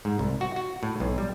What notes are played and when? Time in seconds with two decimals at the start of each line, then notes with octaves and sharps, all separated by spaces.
0.05 G#2
0.19 C2
0.41 F#4
0.56 F#4
0.83 A2
1.00 B1
1.18 G3